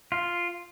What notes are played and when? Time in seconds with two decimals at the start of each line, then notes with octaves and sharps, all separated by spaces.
0.12 F4